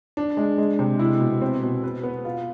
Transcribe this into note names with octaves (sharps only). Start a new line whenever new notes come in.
D4
G#3
G#3
C3
E4
B2
C4
B2
B4
B3
F4